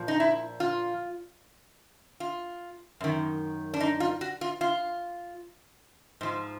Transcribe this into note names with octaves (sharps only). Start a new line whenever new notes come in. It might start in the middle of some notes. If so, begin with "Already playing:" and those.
Already playing: A#2 F3
D#4
E4
F4
F4
F#2 D#3
D4
D#4
F4
F#4
F4
F4
G#2 F3